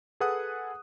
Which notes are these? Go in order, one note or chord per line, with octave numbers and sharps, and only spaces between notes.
G#4 A4 B4 F#5 D#6 F#6